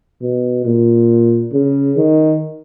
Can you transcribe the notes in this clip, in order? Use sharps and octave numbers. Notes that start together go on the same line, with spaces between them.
B2
A#2
C#3
D#3